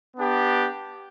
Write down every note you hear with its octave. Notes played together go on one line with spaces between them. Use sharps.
B3 D4 G4